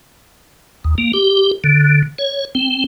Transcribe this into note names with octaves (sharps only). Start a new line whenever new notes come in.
D#2
A#3
G4
D3
C#5
C4